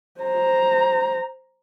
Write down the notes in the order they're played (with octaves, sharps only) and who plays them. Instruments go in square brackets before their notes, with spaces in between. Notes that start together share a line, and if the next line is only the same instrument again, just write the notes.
[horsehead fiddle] C5 A#5